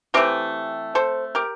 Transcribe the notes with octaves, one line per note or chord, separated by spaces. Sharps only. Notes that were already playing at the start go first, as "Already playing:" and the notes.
E3 A3 C4 G4 A#4
A4 C5
G4 A#4